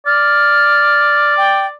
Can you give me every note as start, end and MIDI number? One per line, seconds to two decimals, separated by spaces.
0.06 1.77 74
0.06 1.37 89
1.37 1.66 79